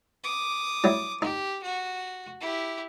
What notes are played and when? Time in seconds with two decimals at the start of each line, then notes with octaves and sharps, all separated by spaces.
0.23 D6 D#6
0.84 F#3 G3 E4
1.22 D#4 G4
1.63 F#4
2.40 E4 G4